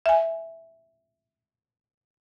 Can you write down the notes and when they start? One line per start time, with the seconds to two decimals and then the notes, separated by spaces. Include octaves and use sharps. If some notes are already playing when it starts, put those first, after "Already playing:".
0.06 E5 G#5